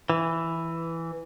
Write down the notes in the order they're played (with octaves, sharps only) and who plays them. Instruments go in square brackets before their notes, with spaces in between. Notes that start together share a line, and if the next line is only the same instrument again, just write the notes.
[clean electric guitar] E3